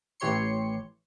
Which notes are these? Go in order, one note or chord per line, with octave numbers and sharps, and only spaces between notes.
A1 E3 G4 C#5 C6 C#7